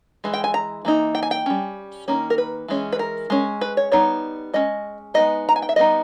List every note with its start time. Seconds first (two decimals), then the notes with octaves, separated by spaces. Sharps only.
0.24 E3 G#3
0.34 G5
0.44 G#5
0.54 A#5
0.85 E3 A#3 D#4
1.15 G5
1.23 G#5
1.31 G5
1.46 G3 C#4
2.08 D#3 A#3 C#4
2.30 A#4
2.38 B4
2.68 E3 G#3 C#4
2.93 B4
2.99 A#4
3.30 G#3 C#4
3.61 B4
3.77 C#5
3.92 G3 B3 D#4 C#5
4.53 G#3 C#4 D#5
5.14 G#3 B3 D#4 D#5
5.49 A#5
5.56 G#5
5.62 G5
5.69 E5
5.76 G3 B3 D#4 D#5